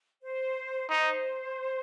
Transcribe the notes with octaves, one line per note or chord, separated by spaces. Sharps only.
C5
D#4 C5